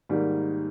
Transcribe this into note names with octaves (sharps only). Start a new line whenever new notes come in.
G#2 D#3 G3 A#3